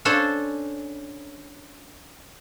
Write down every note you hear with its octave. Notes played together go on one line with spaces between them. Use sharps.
C#4 D4 A4 C5